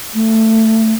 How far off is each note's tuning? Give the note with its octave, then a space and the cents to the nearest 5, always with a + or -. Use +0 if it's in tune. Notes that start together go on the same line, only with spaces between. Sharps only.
A3 +15